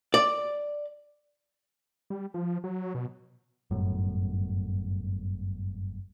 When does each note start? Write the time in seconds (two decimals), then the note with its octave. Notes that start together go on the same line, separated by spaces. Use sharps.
0.14 D5
2.10 G3
2.34 F3
2.64 F#3
2.95 B2
3.71 G1 F#2 A2